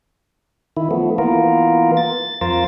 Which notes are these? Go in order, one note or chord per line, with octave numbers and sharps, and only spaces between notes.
D#3 E4
F3 A3 B3
E3 A#3 B3 F4 A#4
A6
F2 F4 A#4 C5 A6